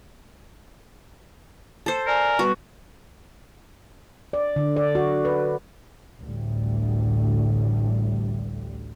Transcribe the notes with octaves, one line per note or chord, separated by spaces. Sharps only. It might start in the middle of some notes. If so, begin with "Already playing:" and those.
A4 C5
A#4 D5 G#5
G3 B3 F#4 B4
D5
D3
D5
F#4
B4
A1 D2 A2 G3